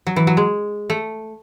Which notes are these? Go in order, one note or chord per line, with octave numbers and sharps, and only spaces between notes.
F#3
E3
F#3
G#3
A3